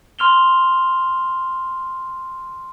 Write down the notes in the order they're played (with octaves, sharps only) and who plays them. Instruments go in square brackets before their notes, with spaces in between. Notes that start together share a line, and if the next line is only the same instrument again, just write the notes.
[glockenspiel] C6 F6 F7 G7